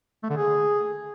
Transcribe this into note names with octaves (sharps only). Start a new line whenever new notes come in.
A3
D3
G#4